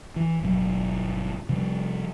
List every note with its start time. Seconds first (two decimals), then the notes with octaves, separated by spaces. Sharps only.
0.16 E3
0.41 G1 B2 F#3
1.49 C3 F3 G3